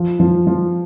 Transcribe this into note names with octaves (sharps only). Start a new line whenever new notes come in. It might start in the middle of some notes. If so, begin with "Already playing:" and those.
Already playing: F3
F3
F3